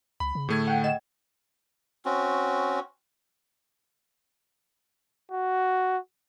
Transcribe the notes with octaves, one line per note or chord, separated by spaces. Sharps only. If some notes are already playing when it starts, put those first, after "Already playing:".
C#2 B5
C#3
A2 D3 A3 G#4 G#6
F#5 G5
D#5 F#5 G5 E7
C4 C#4 F#4
F#4